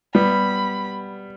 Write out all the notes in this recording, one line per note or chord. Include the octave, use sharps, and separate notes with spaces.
G3 B3 B5